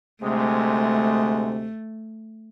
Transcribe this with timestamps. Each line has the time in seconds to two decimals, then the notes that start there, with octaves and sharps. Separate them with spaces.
0.23 D2 C3 G#3 A3